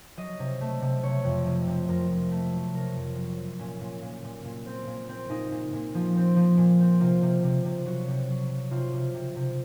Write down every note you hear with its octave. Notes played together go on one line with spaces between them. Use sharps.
F#3 D#5
C3
A3
C3
C3 C#5
F2
C3
C3
F2 A#4
F2
A3
F#3
C3 A#4
F2
F#3
F#3
A#2 C#4
A#2
A#2
A#2
A#2
C4
A#2
C4
A#2 D#4
A#2
A#2
F3
C4
F3
A#2
C4
C3 F4
C3
C3
C3
F#3 F#4
C3
F#3
F#3
C3 F4
C3
C3
C3